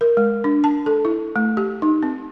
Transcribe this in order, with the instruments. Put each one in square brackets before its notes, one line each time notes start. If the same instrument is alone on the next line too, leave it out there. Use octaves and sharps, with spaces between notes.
[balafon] A#4
G#3
D4
A5
A4
E4
A3
G4
D#4
C4